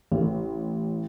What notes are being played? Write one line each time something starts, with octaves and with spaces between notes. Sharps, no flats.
A1